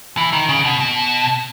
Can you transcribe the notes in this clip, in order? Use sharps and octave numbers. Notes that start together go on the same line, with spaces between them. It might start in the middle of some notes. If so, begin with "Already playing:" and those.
E3
D#3
C#3
B2
B2